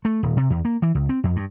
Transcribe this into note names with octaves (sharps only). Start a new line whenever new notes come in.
A3
D#1
C3
E2
A#3
E3
C#2
C4
F2
G2